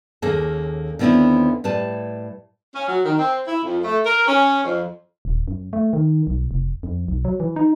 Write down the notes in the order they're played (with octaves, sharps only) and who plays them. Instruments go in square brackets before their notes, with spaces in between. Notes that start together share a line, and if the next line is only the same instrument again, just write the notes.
[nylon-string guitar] D#2 A#3 C#4 G#4 A4
D#2 D3 B3 C4 E4 C#5
A2 G3 B4 A5
[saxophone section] C#4
F#3
D#3
C4
E4
F2
A3
A#4
C#4
F2
[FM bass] D#1
F#2
A3
D#3
B1
F1
F2
B1
F#3
E3
D#4